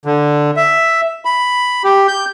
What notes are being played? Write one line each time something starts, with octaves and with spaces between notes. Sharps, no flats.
D3
E5
B5
G4
G6